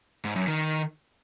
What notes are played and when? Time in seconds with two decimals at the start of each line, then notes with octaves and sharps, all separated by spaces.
0.25 G#2
0.36 F#2
0.47 D#3